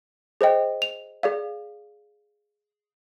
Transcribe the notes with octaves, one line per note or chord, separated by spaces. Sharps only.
G#4 C5 D#5 G5
F7
G#4 D5 F5